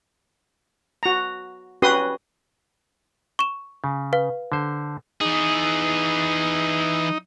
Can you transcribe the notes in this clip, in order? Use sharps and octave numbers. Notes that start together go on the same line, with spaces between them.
F#4 A#5
C#4 F#4 G4 B4 C6 D#6
C#6 E7
C#3
B4 F5
D3 C5
E3 D#4 G#4